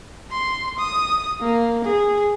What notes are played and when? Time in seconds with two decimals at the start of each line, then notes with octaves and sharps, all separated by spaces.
0.31 C6
0.78 D#6
1.41 A#3
1.84 G#4